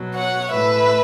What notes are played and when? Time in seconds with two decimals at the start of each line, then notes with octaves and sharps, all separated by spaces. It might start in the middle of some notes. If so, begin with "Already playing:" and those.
Already playing: B2 F#3
0.15 C#5 F#5
0.52 A2 E3 B4 E5